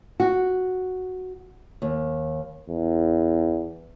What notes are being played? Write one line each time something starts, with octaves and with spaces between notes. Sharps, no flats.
F#4
D#2
E2